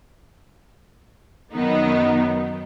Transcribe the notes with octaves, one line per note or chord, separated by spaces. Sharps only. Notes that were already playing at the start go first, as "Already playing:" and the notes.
F#2 D#3 F#3 B3 D#4